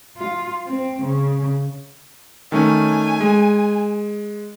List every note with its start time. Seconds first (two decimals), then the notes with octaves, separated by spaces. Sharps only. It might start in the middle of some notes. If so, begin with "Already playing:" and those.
0.17 F4
0.67 C4
1.02 C#3
2.52 D#3 A3 C#4 G#5
3.20 G#3